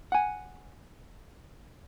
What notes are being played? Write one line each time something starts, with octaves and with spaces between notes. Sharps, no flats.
F#5 G#5